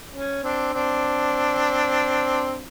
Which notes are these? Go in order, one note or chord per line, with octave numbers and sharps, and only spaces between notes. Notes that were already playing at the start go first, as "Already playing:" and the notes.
C#4
C4 D4
C4 D4